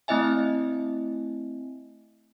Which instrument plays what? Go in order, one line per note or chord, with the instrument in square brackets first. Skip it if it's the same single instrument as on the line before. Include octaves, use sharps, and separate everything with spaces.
[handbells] A3 C4 E4 D#5 E5 G#5